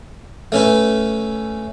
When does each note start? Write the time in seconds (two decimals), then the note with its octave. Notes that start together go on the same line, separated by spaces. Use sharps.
0.52 A3 C#4 B4